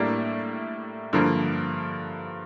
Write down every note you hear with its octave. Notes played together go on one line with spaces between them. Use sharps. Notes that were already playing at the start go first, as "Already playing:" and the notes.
Already playing: A2 G3 A#3 D4
G2 D3 F3 A#3